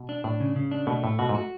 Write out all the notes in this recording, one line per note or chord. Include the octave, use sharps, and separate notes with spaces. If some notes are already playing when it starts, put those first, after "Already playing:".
Already playing: B2
D4
A2 D4
C#3
C#3
D4
B2 A3
A2 A3
B2 F#4
G#2
F#4